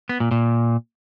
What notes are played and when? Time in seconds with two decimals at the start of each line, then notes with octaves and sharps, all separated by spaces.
0.09 B3
0.20 A#2
0.31 A#2